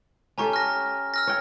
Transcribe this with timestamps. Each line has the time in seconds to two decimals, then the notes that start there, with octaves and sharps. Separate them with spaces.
0.38 C#4 G4 A4 G#5 A#5 C#6
0.53 F6 A#6
1.14 E6 F6 A#6
1.27 C#5 G5